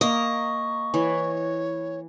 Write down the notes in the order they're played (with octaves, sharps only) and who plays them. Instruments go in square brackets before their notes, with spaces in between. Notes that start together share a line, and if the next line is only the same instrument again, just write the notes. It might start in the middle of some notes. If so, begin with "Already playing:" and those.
[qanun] A#3 [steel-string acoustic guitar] D#5 [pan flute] C#6
[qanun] E3 [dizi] C#5